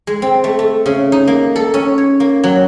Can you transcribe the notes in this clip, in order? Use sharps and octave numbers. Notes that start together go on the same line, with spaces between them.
G#3
C4
A3
A3
C#3
D#4
A#3
A4
C#4
C#5
A#3
F#3